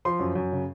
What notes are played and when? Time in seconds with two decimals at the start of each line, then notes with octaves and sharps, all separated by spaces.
0.05 F3 C6
0.20 F#2
0.35 F#2
0.52 C#3